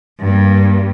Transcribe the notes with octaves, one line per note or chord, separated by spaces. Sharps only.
G2 A#3